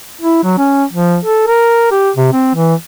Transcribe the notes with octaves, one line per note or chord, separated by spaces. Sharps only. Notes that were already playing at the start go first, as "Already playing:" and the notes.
E4
F#3
C#4
F3
A4
A#4
G4
C3
C4
E3